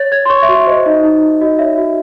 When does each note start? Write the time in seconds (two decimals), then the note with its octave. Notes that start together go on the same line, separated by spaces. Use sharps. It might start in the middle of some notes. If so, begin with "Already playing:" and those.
Already playing: C#5 A6
0.12 C#5 G#6
0.26 C6
0.30 C#5 C#6
0.42 E5
0.49 F#4
0.55 E5
0.67 C5 D#5
0.85 D#4 D#5
1.04 D#4
1.23 D#4
1.41 F#4 D#5
1.59 C#5 E5
1.78 F#4